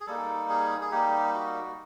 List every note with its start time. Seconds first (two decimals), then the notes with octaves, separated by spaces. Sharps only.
0.01 G#4
0.07 G3 A#3 D#4 A4
0.49 G#4
0.81 G#4
0.91 G3 A#3 D#4 G4
1.34 F#4